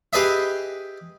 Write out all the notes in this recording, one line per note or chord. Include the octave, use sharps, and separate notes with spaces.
G4 G#4 B4 D#5 E5